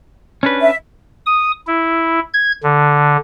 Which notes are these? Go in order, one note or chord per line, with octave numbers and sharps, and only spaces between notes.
C#4 D4 B4
E5
D#6
E4
G#6
D3